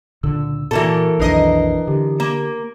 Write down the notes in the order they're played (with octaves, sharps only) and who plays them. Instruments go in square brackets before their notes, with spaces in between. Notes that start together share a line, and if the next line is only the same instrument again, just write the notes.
[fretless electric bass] C#2 A#2 D3 [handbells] E6
[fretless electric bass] A#2 [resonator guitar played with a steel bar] E3 A#3 A4 [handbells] F#4 A#4
[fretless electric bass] B1 F2 D#3 [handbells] D4 B4 C7 [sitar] A#4 D#5
[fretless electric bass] D3 [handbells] G4
[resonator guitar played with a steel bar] A#3